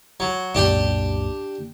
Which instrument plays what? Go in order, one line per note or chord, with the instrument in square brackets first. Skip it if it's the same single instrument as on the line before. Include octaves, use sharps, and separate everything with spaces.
[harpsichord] F#3
[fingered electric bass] C2 F#2 A#2 [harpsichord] D4 G4 G5